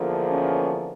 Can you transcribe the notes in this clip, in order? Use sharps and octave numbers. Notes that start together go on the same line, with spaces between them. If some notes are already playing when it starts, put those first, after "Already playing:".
Already playing: E2 D3 F3 A#3
C#4